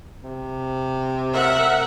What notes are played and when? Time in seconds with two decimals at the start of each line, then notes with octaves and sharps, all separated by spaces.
0.23 C3
1.33 A#4 E5 F#5